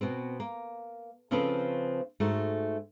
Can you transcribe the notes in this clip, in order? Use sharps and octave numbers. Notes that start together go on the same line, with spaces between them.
B2 B3 C4
A#3
C#3 F3 C4 C#4 A4 B4
G#2 A3 F#4